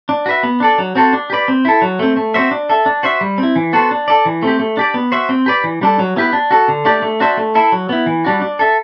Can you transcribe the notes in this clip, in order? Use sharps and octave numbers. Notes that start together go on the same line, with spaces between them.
D4
F#4 B4 E5
B3
D4 A4 D5
F#3
C4 F#4 A4 C5
D4
G4 B4 D5
C4
E4 A4
F#3
A3 C4
A3
C4 F#4 C5 E5
D4
A4 E5
D4
F#4 C5 E5
G3
C4
E4
E3
B3 F#4 A4 C5
D4
A4 D5
E3
A3 C4 G4
A3
D4 G4 D5
B3
F#4 C5 E5
C4
G4 B4 D5
E3
G3 D4 A4
F#3
B3 E4 G4 B4
D4
F#4 A4
D3
A3 D4 G4 D5
A3
D4 F#4 C5 E5
A3
E4 A4 E5
F#3
B3 E4
E3
G3 D4 F#4
D4
A4 E5